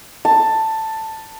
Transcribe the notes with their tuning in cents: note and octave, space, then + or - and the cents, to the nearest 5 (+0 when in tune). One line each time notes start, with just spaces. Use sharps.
A5 +10